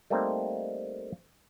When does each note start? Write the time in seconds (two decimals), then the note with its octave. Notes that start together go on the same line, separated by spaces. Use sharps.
0.10 G3 A3 A#3 C4 D#4